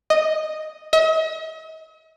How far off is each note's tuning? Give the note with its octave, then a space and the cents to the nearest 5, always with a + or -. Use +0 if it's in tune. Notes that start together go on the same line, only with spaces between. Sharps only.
D#5 +0
D#5 +45